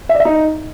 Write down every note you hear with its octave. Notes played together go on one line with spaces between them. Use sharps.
E5
D5
E5
D#4